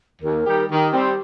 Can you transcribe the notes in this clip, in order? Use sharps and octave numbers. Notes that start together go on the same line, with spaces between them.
D#2 A#4
D#3 G3 D#4 G4
D#3 G4
G3 C4